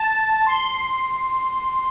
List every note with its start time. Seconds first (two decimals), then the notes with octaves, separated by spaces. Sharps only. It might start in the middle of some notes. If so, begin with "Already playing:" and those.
Already playing: A5
0.46 C6